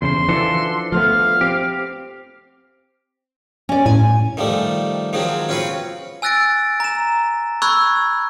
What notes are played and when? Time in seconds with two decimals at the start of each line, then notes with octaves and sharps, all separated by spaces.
0.02 E2 C#3 C5 C6
0.29 E3 F3 D4 F#4 A4
0.92 F3 A3 B3 F5
1.41 C4 G4
3.69 C#4 D5
3.86 A2 G#5
4.37 D#3 F3 G3 A3
5.13 D#3 F3 F#3 G#3 C4
5.49 C4 C#4 F4 F#4 B4
6.22 G#5 E6 F#6 A6 A#6 D7
6.80 A#5 E7
7.62 B5 C#6 E6 F#6 G#6